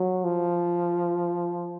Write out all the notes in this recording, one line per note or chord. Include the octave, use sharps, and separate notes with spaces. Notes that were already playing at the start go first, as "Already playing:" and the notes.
Already playing: F#3
F3